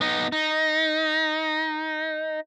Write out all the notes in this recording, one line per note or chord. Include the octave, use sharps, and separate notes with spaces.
B3 D#4
D#4